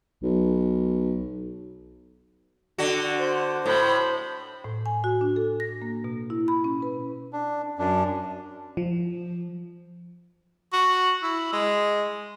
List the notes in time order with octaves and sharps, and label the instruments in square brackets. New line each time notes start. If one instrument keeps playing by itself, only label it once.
[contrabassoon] B1
[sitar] D3 F#4
[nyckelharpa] C5
[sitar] A2 [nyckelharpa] C5 B5
[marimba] A2
G#5
F#4
D4
A4
A#6
A#3
B2
E4
B5
C#4
B4
[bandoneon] D4
F#2 D4
[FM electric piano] F3
[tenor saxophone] F#4
E4
G#3